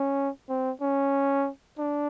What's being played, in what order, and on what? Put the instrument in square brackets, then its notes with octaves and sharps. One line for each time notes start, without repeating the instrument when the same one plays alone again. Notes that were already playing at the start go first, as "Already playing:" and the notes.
Already playing: [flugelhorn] C#4
C4
C#4
D4